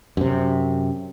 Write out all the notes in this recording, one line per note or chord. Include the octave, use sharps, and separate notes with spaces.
F#2 C3